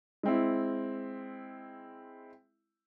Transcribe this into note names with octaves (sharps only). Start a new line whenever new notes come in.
G#3 C4 E4